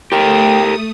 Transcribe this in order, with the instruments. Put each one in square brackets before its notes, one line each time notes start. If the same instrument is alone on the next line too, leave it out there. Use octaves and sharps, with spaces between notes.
[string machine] A3 D#6 [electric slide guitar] G4 A#4 [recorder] G5